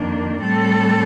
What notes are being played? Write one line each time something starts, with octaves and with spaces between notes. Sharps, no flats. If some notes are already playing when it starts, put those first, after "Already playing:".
Already playing: F2 D#3 A#3 D4
A2 G3 C4 A4